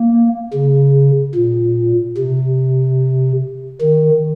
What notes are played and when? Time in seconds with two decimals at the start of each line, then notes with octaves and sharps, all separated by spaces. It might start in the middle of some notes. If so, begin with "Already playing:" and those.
Already playing: A#3
0.53 C#3
1.35 A#2
2.17 C3
3.82 D#3